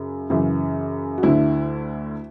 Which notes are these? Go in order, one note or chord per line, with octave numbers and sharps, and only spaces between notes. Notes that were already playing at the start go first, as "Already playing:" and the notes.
Already playing: F#2 C#3
F#2 C#3 E3
F#4
D2 D3 E4